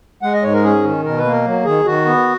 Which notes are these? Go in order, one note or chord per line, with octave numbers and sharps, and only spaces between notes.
G#3 F#5
D#5
G#2 C#5
A#4
C#4 G#4
D#3
B2 A#4
B4
A#3
A#4
F#3
D#3 G#4
D#3 F#4
B3